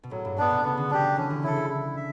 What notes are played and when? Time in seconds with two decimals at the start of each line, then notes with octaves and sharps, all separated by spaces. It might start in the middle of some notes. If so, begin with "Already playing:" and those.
0.03 B2
0.11 A2 F#3
0.25 G2
0.38 A2 B3 D4
0.51 B2
0.64 C#3 B3
0.77 D3
0.90 F#3 D4 G4
1.03 F#3
1.17 E3 C#4
1.30 D3
1.43 C#3 E4 A4
1.56 D3
1.70 E4
1.96 E5